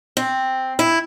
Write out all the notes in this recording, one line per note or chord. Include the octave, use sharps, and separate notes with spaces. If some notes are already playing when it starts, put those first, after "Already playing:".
C4
E4